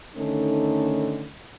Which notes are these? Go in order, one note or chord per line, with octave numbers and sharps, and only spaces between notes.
D3 D#3 A3 C#4 D#4 A4